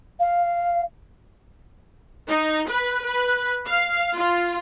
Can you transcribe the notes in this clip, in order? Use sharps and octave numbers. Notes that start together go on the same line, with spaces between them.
F5
D#4
B4
B4
F5
F4